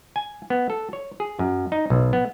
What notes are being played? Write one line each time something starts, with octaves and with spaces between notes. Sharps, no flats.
G#5
B3
A4
C#5
G#4
F#2
D#4
B1
B3